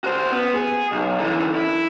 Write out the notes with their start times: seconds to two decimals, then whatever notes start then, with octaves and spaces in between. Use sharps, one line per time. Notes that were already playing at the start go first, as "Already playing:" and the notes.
0.04 F#4 C5
0.32 B3
0.54 G#4
0.92 B1
1.19 D3 E3
1.56 E4